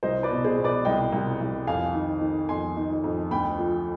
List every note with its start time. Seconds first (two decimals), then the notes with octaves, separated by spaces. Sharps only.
0.03 C2 C5 D#5
0.23 B4 D5
0.31 B2
0.44 G#4 C5
0.58 B2
0.64 B4 D5
0.85 C2 D#5 G5
1.13 C2
1.40 C2
1.67 F2 F5 G#5
1.94 D#3
2.21 D#3
2.49 F2 G#5 C6
2.77 D#3
3.04 F2
3.31 D2 G5 B5
3.59 F3